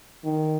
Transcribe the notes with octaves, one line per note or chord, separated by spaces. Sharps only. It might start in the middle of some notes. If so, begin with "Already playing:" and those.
D#3